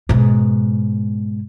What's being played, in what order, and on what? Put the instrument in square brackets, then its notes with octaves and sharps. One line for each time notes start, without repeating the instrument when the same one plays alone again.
[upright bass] G#2 B2